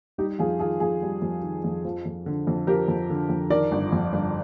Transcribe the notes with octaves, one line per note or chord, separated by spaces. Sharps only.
G3 D#4 G4
F2 F4 G#4
D#3 F4 G#4
F2 F4 G#4
G3
F2
D#3
F2
F3
F2
D3
F2
F3 G4 A#4
F2
D3
F2
D#3 A#4 D5
G1
F2
G1